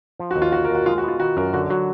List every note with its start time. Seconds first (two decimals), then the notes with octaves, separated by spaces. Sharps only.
0.20 F3
0.31 F#4
0.36 D#2
0.42 F4
0.52 D3 F#4
0.64 A#4
0.70 D#2
0.75 F#4
0.86 G#3 F4
0.98 F#4
1.03 B3 F4
1.20 D#3 F#4
1.37 F#2 A#4
1.53 D3 F#4
1.70 F#3 F#4